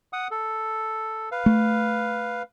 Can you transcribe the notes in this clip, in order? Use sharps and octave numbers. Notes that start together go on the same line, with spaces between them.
F#5 D#6
A4
B4 F5
A3